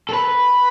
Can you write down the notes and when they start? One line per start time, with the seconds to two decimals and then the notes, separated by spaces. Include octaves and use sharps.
0.09 A4
0.13 B4